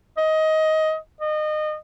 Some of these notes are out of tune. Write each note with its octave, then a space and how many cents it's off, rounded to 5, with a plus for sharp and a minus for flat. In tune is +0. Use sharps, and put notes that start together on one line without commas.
D#5 +15
D#5 -25